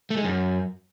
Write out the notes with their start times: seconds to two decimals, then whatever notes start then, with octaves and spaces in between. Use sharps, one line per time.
0.10 A3
0.18 G#3
0.25 F#2